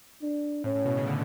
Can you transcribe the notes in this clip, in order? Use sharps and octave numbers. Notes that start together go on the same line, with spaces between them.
D4
A2 C#4
A2
B2
C#3
D3